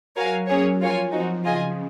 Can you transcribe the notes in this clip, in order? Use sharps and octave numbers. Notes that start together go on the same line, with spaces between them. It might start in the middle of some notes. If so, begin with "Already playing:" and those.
F#3 F#4 A#4 C#5 F5 G#5
F#3 A#3 C#4 G#4 C#5
F3 F4 A#4 C#5 G#5
F3 C4 D#4 F#4
C#3 F4 G#4 D#5 G#5